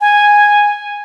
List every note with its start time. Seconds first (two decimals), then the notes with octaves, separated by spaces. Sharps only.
0.01 G#5